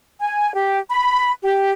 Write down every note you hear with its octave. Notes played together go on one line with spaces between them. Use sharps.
G#5
G4
B5
G4